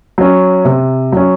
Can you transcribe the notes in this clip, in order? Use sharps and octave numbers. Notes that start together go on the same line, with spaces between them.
F#3 C#4
C3
F#3 C#4